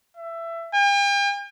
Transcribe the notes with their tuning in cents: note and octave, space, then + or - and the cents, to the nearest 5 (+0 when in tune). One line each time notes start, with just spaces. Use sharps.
E5 +20
G5 +45